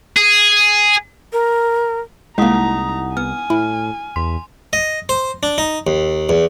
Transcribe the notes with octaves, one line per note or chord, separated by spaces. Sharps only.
G#4
A#4
C2 G#3 A#3 D#4 E4 F#5 A#5 D#6
B3 G#5 F6
A2 E4
E2 C6 B6
D#5
C5
D4
D#4
D#2
E2